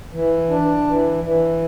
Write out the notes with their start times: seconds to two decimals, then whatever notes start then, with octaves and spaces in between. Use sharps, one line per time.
0.13 E3
0.50 D4
0.87 E3
1.24 E3